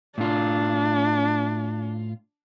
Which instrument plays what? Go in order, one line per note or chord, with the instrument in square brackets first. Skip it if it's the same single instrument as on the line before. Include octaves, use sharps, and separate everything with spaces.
[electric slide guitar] A2 F4 [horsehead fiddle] D4